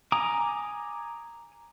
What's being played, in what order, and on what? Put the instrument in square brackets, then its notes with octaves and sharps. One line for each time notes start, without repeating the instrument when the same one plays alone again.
[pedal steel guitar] G#5 A#5 D6 D#6